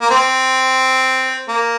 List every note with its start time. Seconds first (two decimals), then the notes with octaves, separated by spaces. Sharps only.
0.02 A#3
0.10 C4
1.48 A#3